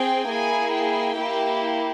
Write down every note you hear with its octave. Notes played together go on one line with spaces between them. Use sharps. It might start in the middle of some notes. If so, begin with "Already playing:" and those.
Already playing: C4 G#4 G5
A#3 E4 G#4 G#5
G5
A#3 E4 G4